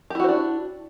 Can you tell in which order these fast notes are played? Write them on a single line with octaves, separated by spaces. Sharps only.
G4 E4 F#4 C5 D4